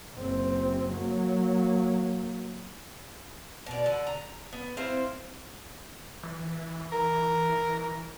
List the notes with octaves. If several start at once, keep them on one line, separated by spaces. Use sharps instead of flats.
F#1 C4
F#3 A#3
B2 D5
D3
A#5
B3
C4 E4 F4 C5
E3
A#4